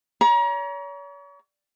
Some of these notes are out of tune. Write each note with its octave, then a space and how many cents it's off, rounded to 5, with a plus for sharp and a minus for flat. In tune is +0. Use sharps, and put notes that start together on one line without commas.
C#5 +40 A#5 +35